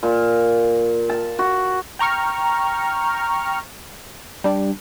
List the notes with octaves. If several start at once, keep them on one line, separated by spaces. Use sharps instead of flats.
A#2
A5
F#4
G5 A#5 C#6 F6
G3 D4